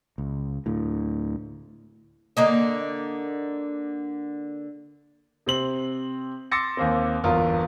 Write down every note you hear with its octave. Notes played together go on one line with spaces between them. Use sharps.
C#2
D2 A2
D3 A#3 D#5
C3 C4 F#7
C6 D6 E6 A6 A#6 C#7
D#2 A#3 C4
G1 E2 F4 A#4